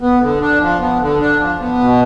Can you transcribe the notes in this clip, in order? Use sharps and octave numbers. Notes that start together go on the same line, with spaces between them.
B3
D3
D4
F3
B3
D3
D4
F3
B3
B2